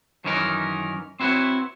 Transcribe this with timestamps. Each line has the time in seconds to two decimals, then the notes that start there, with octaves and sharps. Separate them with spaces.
0.24 F#2 D#3 E3 C#4 D#4 A#4
1.20 C4 E4 F#4 B4 C#5